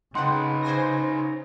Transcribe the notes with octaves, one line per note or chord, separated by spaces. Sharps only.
C#3 D#4 B4 F#5 G5 C6
C5 G#5 A#6